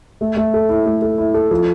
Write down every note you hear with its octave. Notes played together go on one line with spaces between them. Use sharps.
A3
A3
A4
E4
A3
A4
E4
A4
F3